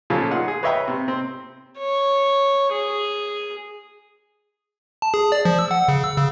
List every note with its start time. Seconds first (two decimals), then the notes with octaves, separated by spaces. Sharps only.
0.10 A#2 C#3 F3 A3 C#4
0.30 D#4 F4 G#4 A#4 F#5
0.48 G#4
0.63 B4 C#5 D#5 E5 G5 A#5
0.88 C3
1.08 C4
1.78 C#5
2.72 G#4
5.02 A5
5.14 G#4
5.32 D5
5.45 F3
5.59 E6
5.71 F#5
5.88 C#3
6.04 E6
6.17 C#3